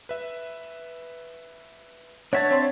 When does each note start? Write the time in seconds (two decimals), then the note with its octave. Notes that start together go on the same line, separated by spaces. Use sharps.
0.09 B4 E5
2.33 D4 C#5 E5 F#5 A5 G#6
2.51 C4 C6